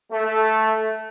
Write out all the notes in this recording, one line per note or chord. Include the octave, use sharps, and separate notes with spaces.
A3